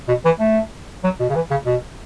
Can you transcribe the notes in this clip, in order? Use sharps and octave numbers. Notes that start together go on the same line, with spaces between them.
B2
E3
A3
F#3
B2
C#3
E3
C#3
B2